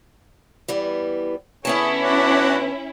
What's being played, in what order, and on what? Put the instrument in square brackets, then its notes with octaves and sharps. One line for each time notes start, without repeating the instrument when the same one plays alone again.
[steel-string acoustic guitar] E3 G3 B3
[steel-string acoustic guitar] D3 B3 A5 [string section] C#4 E4 [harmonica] G#4 C#5
[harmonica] D4 F#4 D5